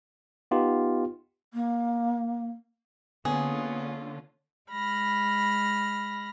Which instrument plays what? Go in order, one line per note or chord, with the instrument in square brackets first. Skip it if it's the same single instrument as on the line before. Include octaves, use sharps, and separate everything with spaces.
[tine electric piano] B3 D#4 F4 G4
[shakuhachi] A#3
[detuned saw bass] D3 [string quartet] A#3 C#4 F4 [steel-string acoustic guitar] B3 [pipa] G#4
[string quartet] G#3 B5 F6 A#6